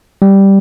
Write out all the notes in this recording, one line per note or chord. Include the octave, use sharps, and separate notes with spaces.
G3